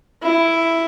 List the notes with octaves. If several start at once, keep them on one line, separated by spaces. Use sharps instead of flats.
E4